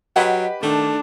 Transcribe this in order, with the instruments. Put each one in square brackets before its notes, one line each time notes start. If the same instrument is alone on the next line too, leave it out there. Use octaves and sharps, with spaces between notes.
[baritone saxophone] F#3 [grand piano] G4 B4 [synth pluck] D#5 F#5
[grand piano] D#3 [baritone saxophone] A3 [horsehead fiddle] D4